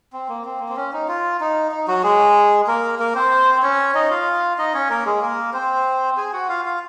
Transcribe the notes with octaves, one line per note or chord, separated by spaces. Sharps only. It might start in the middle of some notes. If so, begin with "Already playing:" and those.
C4
A#3
C4
A#3
C4
C#4
D#4
F4
D#4
D#4
F#3 F#4
G#3 G#4
A#3 A#4
A#3 A#4
C4 C5
C#4 C#5
D#4 D#5
F4 F5
D#4 D#5
C#4 C#5
A#3 A#4
G#3 G#4
A#3 A#4
C4 C5
G#4 G#5
F#4 F#5
F4 F5
F4 F5